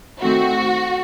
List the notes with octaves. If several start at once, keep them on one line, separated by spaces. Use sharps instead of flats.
D#3 A3 C4 F#4